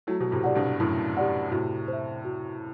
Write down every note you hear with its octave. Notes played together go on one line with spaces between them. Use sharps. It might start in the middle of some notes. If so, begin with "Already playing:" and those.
F#3 A3 E4
B2
A2 C3
G4 D5 F#5
G2 B2
F#2 A2 E4
G4 D5 F#5
A2 C3 F#4
C5 E5
F#4